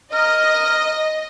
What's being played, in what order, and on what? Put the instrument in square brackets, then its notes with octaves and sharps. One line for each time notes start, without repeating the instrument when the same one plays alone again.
[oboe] A#4 [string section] D#5